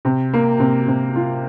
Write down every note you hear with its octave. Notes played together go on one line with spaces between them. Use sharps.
C3
A#3
C3
C3
F4